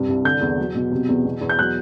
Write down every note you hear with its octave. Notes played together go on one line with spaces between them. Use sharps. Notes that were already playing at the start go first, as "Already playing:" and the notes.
Already playing: G2 C3
C2
D3 G6
E2
F#3
B2
C3
E2
B2
E2
G6
F#3 F#6